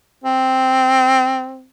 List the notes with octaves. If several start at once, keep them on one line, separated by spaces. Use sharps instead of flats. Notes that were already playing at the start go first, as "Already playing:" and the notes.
C4